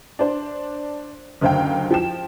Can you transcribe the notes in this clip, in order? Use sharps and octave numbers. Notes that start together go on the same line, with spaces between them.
D4 C5
F#1 D2 C5 F5 G5
F3 G5 E7